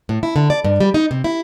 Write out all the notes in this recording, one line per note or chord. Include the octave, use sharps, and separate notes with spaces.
A2
E4
D3
D5
G2
G3
D#4
C3
E4